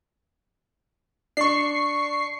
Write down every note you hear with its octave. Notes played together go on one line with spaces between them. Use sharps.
D4 C#6 C7